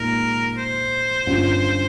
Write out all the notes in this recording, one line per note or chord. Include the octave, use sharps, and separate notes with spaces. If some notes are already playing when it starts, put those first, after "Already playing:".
Already playing: A#2 G#3 D#4 A#4
C5
G1 G2 G3 C#4 F4